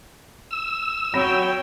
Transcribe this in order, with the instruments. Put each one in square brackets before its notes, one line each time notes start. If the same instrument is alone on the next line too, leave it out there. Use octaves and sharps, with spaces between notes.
[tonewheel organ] E6
[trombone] F#3 [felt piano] C4 B5 A#6 [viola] C#5 G5